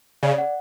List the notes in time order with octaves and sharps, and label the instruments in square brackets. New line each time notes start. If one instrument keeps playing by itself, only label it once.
[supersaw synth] C#3 [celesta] D5
[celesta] F#5